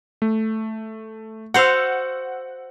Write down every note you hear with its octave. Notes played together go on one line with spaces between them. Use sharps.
A3
F#4 C5 F5 F#5 E6